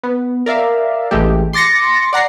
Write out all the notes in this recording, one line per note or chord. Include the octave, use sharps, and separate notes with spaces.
B3
A#4 D5 E5 F5
A1 E3 G#3 A3 G4
C6 D6 A6 A#6 C#7
D5 F#5 A#5 C7